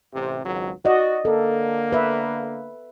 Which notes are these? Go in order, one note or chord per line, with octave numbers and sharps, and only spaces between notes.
A1 C3
G#1 C#2 F#3
F#4 D5 D#5
D3 A#3 A4
B4 E5